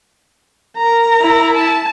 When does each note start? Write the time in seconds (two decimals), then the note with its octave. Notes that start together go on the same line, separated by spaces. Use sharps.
0.77 A#4 A#5
1.21 E4
1.55 A5